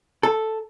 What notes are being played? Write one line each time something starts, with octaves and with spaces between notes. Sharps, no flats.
A4